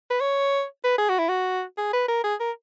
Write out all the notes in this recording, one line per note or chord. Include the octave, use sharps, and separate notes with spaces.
B4
C#5
B4
G#4
F#4
E4
F#4
G#4
B4
A#4
G#4
A#4